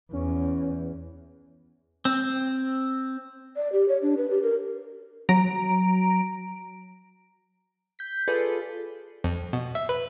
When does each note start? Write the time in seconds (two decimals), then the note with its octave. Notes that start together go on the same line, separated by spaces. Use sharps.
0.13 E2 C#4
2.05 C4
3.56 D5
3.73 G4
3.89 C#5
4.02 D4
4.17 B4
4.30 G4
4.43 A#4
5.29 F#3 A#5 D7
7.99 G6 B6
8.28 F4 G#4 A4 B4 D5
9.24 F2
9.53 B2
9.75 E5
9.89 B4